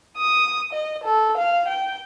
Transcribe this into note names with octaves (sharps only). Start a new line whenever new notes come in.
D#6
D#5
A4
F5
G5